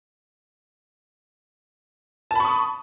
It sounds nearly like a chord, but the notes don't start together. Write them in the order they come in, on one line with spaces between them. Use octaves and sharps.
A5 B5 C#6 D#6